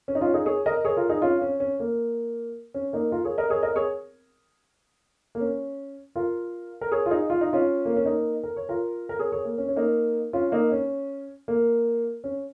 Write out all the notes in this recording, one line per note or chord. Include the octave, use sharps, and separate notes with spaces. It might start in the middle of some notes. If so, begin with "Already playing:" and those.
C#4
D#4
C#4 F4
D#4 G#4
G#4 C#5
A#4 D#5
G#4 C#5
F4 A#4
D#4 G#4
C#4 F4
C#4
C#4
A#3
C#4
A#3 D#4
F4 A#4
G#4 C#5
A#4 D#5
G#4 C#5
A#4 D#5
G#4 C#5
A#3
C#4
F4 A#4
A#4
G#4 C#5
F4
D#4 G#4
F4
D#4
C#4 F4
A#3
C#4
A#3 D#4
A#4
C#5
F4 A#4
A#4
G#4 C#5
G#4 C#5
A#3
C#4
C#4
A#3 D#4
C#4 F4
A#3 D#4
C#4
A#3
C#4